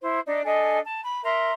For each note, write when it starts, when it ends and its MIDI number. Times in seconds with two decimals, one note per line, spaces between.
0.02 0.19 64
0.02 0.19 72
0.25 0.42 62
0.25 0.42 63
0.25 0.42 74
0.25 0.42 75
0.44 0.78 62
0.44 0.78 69
0.44 0.78 75
0.44 0.78 80
0.85 0.99 81
1.02 1.20 83
1.24 1.51 70
1.24 1.51 76
1.24 1.51 82
1.24 1.51 84